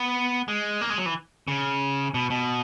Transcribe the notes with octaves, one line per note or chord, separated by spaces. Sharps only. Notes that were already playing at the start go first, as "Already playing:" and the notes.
Already playing: B3
G#3
A#3
G#3
F#3
E3
C#3
B2
B2